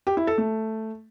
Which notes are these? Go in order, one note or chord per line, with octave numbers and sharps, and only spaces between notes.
G4
E4
A4
A3